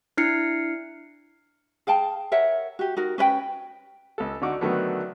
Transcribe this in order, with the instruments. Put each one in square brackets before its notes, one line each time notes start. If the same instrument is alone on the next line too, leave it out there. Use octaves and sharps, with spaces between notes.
[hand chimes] D4 E4 F6 C7 C#7
[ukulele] G#4 F5 G5 A5
A#4 C#5 E5 F#5
F#4 G4
D#4 F#4 A#4
C#4 B4 D#5 G5
[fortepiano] C#2 A4
D3 D#4 F#4 D6
D3 D#3 F#3 A3 B3